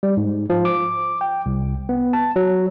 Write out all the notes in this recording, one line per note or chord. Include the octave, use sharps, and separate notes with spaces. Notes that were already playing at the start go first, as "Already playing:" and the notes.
G3
G#2
F3
D6
G5
C2
B3
A5
F#3